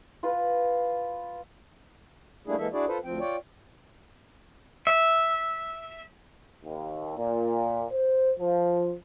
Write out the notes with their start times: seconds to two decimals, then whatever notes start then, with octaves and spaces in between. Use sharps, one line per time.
0.23 F4 B4
2.47 G3 A3 A#3 D4 E4 G#4
2.58 E3 G#3 A#3 A4 E5
2.73 D4 E4 F#4 G#4 D5
2.88 F4 A4 B4 C5
3.05 D2 F3 C4 G5
3.20 F4 C#5 D5 G5
4.87 E5
6.64 D#2
7.17 A#2
7.92 C5
8.39 F3